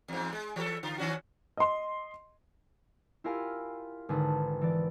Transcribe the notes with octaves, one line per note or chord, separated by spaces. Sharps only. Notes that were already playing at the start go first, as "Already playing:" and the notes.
E2 G#2
G#3
E3 G4 A4
D3 F4
D#3 C#4 F#4
D#5 C6
E4 F4 G4 A#4 F5 G#5
G#1 D3 G#4 B4 A5
E3 D5